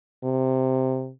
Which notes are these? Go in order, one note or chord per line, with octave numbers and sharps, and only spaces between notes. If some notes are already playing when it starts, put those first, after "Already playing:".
C3